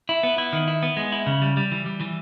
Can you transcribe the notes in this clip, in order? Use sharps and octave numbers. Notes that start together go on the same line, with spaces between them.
E4
B3
E4
D#3
E4
B3
G#3
E4
C#3
G3
G3
E3
G3
E3